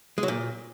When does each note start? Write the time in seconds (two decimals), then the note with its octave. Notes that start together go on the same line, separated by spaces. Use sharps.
0.18 G#3
0.23 F#3
0.28 A#2